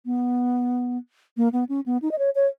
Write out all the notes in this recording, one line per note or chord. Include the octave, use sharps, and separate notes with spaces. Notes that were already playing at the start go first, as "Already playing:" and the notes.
B3
A#3
B3
C#4
B3
D#4
D#5
C#5
C#5